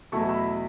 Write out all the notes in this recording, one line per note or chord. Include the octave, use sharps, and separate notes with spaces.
E2 B2 F#3 A3 E4 A5 C#6
B5 E6